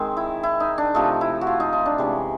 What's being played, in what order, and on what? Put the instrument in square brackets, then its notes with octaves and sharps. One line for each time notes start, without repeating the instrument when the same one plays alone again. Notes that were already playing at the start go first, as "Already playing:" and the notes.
Already playing: [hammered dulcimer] D#3 G#3 C4
E4
E4
D#4
D4
C3 F3 A3 D#4
E4
F#4
F4
D#4
D#4
D4
C3 E3 G#3 C#4